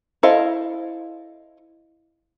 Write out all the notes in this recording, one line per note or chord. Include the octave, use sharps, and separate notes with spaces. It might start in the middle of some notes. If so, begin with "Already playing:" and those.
E4 A4 C5 D#5 F5